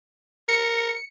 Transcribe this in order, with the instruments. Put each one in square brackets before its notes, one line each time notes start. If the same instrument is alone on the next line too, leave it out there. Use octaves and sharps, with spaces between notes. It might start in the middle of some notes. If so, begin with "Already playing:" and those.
[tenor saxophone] A#4 [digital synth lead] C#7